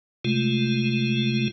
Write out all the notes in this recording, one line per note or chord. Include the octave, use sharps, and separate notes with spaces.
C3 G#3 A3 F4